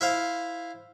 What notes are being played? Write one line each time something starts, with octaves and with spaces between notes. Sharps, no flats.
E4 C5 F5